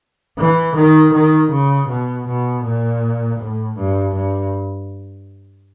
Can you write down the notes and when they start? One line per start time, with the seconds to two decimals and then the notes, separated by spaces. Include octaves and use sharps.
0.39 E3
0.75 D#3
1.13 D#3
1.51 C#3
1.88 B2
2.27 B2
2.64 A#2
3.39 A2
3.77 G2
4.14 G2